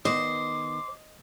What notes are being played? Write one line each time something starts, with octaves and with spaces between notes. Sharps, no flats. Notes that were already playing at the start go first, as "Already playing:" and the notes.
D#3 B3 C5 D#5 D6